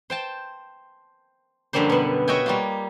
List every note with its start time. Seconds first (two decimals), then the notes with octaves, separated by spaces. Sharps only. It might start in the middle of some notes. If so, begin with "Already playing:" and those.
0.10 C5 G5 A5
1.73 F#2 D3 F3 G3 A#3 C5
1.90 B2 B3
2.28 F#4 C#5 D#5 E5 G5 G#5
2.46 G3 A#3 F4